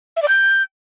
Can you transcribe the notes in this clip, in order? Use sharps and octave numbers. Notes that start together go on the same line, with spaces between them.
E5
D5
G6